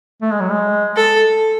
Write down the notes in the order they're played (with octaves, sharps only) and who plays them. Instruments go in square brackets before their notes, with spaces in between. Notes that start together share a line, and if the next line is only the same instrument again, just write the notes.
[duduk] A3
G#3
F#3
G#3
[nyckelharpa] A4